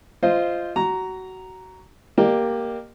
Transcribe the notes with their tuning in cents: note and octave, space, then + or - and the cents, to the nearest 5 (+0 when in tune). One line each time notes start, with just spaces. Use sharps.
F4 -15 C5 +0 D#5 +0
F#4 +20 A#5 +0
A#3 +0 G4 +0 D#5 -45